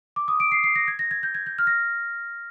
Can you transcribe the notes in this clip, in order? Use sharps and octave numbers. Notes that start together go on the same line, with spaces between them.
D6
D#6
D7
C7
C7
A#6
G#6
A#6
G#6
G6
G#6
G6
F6
A#6